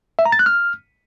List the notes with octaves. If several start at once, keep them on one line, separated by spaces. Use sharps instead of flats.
E5
A#5
A6
F#6
F6